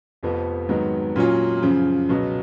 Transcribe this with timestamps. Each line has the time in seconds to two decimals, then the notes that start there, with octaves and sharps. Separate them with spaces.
0.23 F1 F2 F3 B3
0.69 G#2 D#3 F#3 B3
1.16 A#2 F#3 C#4 F4
1.62 F#2 C#3 F3
2.09 C#2 B2 F#3